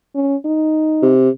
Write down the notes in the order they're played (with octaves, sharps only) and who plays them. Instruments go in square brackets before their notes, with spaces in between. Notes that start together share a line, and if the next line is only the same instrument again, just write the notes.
[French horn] C#4
D#4
[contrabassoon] C3